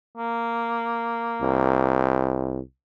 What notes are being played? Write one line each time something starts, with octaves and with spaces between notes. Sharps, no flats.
A#3
C2